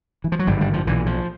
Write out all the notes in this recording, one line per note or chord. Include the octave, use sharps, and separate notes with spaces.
E3
F3
F#3
G#1 G2 D3 G3
G3
F3
B1 A#2 E3
F3